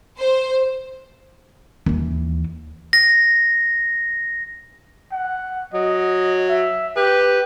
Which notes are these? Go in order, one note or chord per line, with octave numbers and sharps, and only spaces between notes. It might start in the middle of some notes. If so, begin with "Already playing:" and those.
C5
D#2 E3
A#6
F#5
F#3 D#5
E5
G4 B4